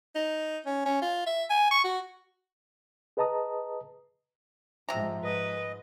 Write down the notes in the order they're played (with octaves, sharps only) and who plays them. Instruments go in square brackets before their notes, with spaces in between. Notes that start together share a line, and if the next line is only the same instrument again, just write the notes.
[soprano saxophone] D#4
C#4
C#4
F4
E5
G#5
C#6
F#4
[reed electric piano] G#4 B4 D#5 A5 A#5 D#6
[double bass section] G#2 F3 [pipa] C3 A#5
[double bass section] G#2 [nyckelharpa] B4 [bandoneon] D#5